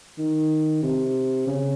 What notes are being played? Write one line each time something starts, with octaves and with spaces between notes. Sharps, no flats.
D#3
C3
C#3